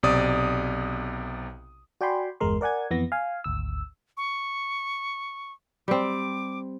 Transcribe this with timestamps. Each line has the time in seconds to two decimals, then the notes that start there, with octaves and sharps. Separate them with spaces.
0.03 B1 C3 D5 D#6
2.01 F#4 D5 G5 G#5 B5 C6
2.40 G1 E2 G#3 A#4 C6
2.61 A#4 D5 F#5 G#5 G#6
2.91 F2 E3 B3 A#6
3.12 F5 G#5
3.44 G#1 D2 E6
4.17 C#6
5.88 G3 C4 D6